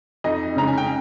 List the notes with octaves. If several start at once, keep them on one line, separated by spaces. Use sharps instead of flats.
F2 D#4 D#5
C#3 G#3 A#5
G#5
G5